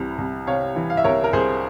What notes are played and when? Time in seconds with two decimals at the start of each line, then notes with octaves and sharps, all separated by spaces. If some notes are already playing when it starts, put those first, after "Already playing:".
Already playing: C2 C3 E3
0.18 C2
0.47 C3 C#5 F5
0.76 E3
0.90 F5
0.97 E5
1.04 C2 A#4 C#5
1.24 A#4
1.33 C2 G#4 C5